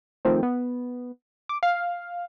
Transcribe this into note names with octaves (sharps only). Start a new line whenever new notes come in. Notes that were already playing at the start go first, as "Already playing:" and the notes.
D#3 F3 A3 C4
B3
D6
F5